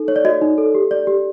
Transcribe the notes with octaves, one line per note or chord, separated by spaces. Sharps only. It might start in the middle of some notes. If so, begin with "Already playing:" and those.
Already playing: D#4 A4
C#5
D5
F#4 D#5
D#4
A4
G4
D5
G4